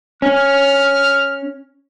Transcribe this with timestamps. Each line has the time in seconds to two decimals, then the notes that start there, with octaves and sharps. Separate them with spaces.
0.22 C#4 F6